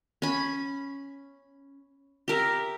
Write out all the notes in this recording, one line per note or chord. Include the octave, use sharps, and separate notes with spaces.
C#4 B5
G4 A#4 E5